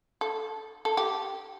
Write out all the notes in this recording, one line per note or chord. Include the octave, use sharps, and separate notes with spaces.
A4
A4
G4